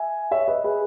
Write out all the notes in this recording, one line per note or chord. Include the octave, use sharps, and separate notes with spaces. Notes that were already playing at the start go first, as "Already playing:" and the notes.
Already playing: E5 G#5
C#5 E5
B4 D#5
G#4 B4